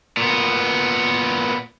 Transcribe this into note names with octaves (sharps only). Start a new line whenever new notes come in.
A#2 B3